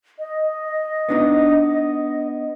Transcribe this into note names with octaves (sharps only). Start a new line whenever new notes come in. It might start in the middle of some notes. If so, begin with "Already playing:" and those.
D#5
B3 D4 D#4